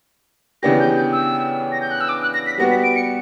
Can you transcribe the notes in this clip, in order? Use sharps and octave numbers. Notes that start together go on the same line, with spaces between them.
C#3 E3 B3 D4 G4 A#6
G6
G6
E6
A#6
G6
F#6
E6
D6
F#6
A#6
B6
G3 B3 F#4 A#6
B6
D7
C#7